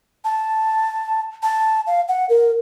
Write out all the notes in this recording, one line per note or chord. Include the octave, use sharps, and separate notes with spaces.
A5
A5
F5
F#5
A#4